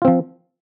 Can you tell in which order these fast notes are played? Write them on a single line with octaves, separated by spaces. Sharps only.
F4 C4 F3